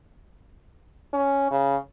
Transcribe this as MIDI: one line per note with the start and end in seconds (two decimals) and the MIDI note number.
1.13 1.46 61
1.51 1.76 49